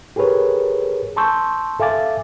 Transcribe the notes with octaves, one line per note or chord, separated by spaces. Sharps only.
G4 G#4 A#4 B4 C#5
G#5 A5 C6 C#6 E6 G6
A4 E5 F5 G#5 D6 A6